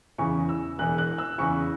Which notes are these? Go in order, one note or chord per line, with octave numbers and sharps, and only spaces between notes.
E2 C#3 E3 C#6
E6
E1 E2 E3 F#6
F#6
E6
E2 C#3 E3 C#6